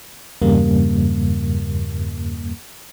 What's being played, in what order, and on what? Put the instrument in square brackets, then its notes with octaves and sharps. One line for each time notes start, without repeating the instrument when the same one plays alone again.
[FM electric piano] E2 G2 C#3 G3 A#3